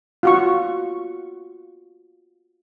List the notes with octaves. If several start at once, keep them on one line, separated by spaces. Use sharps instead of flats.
F4 F#4 C#6